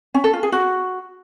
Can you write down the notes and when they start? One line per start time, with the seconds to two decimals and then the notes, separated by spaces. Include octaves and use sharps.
0.14 C#4
0.24 A4
0.33 F4
0.43 G#4
0.52 F#4